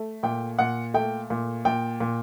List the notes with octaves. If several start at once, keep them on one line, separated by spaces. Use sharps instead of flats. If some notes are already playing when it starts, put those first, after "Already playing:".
Already playing: A3
A#2 G5
A#2 F#5
A3 G5
A#2
A#2 G5
A#2